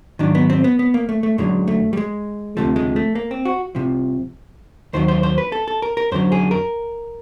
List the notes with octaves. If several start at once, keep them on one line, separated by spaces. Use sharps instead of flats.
G#2 D#3 F#3 D4
B3
C4
B3
B3
A#3
A3
A3
F#2 D3 F#3 G#3
A3
G3
G#3
D2 C3 F3 A3
G#3
A3
A#3
C4
F#4
C2 C3 F3
D#2 D#3 F#3 C5
C5
C5
B4
A4
A4
A#4
A#4
F#2 D3 F#3 C5
G#4
A#4